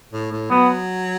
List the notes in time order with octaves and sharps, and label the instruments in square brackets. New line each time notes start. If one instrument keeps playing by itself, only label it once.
[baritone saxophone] A2
A2
[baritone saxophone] F#3 [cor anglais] B3